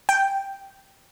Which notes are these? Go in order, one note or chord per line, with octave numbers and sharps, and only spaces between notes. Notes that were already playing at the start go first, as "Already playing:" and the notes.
G5